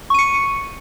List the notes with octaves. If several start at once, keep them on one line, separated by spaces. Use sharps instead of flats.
C#6 C#7 D#7